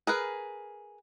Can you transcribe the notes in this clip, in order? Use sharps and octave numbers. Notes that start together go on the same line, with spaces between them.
G#4 A#4 B4